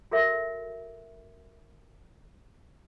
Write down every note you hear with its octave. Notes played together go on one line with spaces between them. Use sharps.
F#4 A4 A#4 E5